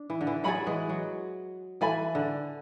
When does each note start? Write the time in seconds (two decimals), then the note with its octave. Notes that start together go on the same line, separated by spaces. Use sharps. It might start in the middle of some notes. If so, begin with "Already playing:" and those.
Already playing: D4
0.10 E3
0.21 D3
0.27 E3
0.44 F#3 G#4 D5 G#5 B5
0.66 E3 G#3
0.89 F#3
1.81 E3 A4 E5 G#5 B5
2.15 D3